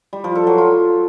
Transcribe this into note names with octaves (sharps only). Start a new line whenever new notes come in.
G3
F3
A4
F#3
F4